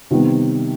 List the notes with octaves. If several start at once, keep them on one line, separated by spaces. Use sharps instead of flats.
C3 D#3 G3 B3